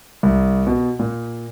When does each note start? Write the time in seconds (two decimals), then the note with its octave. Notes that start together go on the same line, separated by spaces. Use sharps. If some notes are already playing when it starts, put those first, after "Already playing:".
0.23 C2
0.67 B2
0.99 A#2